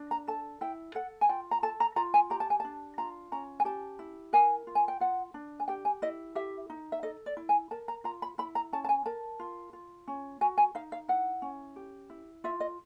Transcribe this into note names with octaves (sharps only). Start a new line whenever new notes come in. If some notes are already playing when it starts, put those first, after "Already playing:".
Already playing: D4
A#5
A4 A5
E4 G5
A4 F#5
G#5
F4 G5
A#5
A4 A5
A#5
F4 A#5
G#5
G4 A#5
A5
G#5
D4 A5
F4 A#5
C#4 A#5
G#5
G4 A5
E4
A#4 G#5
F4
G#5
G5
F4 F#5
D4
G#5
G4 G5
G#5
E4 D#5
G4 E5
D#4
E5
A4 D#5
D5
E4
G#5
A#4 A5
A#5
F4 A#5
B5
E4 B5
A#5
C#4 A5
A5
G#5
A#4 A5
F4
F4
C#4
F#4 G#5
G#5
D#4 F5
F5
E4 F#5
C#4
G4
E4
F4 E5
D#5